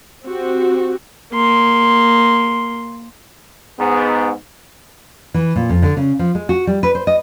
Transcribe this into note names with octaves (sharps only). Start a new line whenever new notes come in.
C4 F#4 G4
A#3 C6
G#2 B3
E3
A#2
F2
D3
C#3
F3
G#3
F#4
G3
B4
C5
D#5